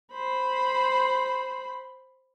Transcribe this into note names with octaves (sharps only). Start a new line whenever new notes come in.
C5 B5